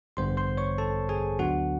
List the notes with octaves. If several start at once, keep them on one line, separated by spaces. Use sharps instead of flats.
A1 G2 D3 G3 B3 C5 C6
C5 C6
C#5 C#6
A4 A5
G#4 G#5
D2 D3 F#3 B3 D4 F#4 F#5